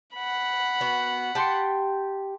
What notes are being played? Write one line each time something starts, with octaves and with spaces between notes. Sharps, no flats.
F#5 B5
B3 F#4
G4 G5 A5 C6 C#7